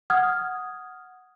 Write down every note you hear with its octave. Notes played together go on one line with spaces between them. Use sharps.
F#5 D#6 F6 G#6